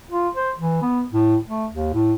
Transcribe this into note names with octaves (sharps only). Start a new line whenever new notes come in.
F4
C5
E3
B3
A2
A3
D#2
A2